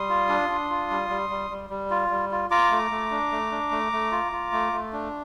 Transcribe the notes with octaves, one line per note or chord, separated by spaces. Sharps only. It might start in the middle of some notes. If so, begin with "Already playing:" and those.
Already playing: G3 C6 D#6
F4
D4
D4
F4
G3
G3
G3
G3
G3
F4
G3
F4
F4 A#5 D6
A3
A3
D4
A3
D4
A3
A3
F4
F4
A3
A3
D4